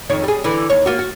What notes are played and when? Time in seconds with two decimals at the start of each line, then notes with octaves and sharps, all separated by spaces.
0.10 F2 D#3 C#5
0.24 G3 G#4
0.44 D3 E3
0.70 D#2 C#5
0.86 A#3 F4 F#4
0.99 F#4